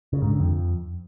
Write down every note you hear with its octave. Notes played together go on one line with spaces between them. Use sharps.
C#3
G#2
D3
F2